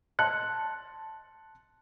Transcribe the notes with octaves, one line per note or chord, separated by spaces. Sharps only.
A5 C6 F#6 C#7